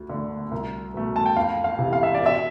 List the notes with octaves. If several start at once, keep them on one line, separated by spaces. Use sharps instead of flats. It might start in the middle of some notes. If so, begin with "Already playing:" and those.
Already playing: D2
D3 A3
C2
B2 A3
A5
G5
F2 F5
F5
C3 E3
F5
E5
D5
B2 E5